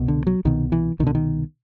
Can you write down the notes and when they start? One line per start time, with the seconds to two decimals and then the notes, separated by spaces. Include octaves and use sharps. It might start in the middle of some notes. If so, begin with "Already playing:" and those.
Already playing: C2 B2
0.08 D3
0.27 F#3
0.45 C2 B2 D#3
0.72 E3
0.99 C2 D#3
1.03 B2 D3
1.15 D#3